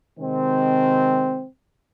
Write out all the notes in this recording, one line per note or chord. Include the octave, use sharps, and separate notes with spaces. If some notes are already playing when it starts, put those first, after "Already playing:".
C3 D#3 G#3 C4